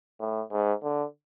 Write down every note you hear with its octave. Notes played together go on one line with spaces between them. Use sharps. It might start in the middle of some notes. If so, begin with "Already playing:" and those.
A2
G#2
D3